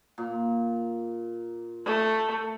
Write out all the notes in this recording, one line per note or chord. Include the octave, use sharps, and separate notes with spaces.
A#2
A3